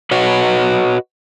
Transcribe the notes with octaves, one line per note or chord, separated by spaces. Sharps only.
F#4 B4 C#5 D#5 F#5